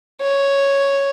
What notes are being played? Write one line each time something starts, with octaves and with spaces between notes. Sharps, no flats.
C#5